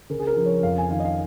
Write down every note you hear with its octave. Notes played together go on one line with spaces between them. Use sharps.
C#3 A#4
G#4
A#4
F3
C#5
F2 F5
G#5
D#3 F5
D#5
F5